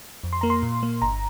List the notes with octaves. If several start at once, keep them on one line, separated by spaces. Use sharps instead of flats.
F2
C6
A#3 A#5
C6
A#2
A#3
G1 A#5